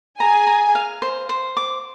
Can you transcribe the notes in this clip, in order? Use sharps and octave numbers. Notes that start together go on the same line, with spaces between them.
G#4 G#5 A#5
A#5
F5
C5
C5
D6